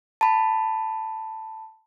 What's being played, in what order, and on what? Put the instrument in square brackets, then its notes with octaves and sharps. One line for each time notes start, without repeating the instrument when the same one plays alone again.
[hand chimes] A5 B5